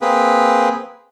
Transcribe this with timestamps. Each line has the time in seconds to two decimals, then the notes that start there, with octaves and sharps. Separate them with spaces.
0.02 A#3 C4 G#4 B4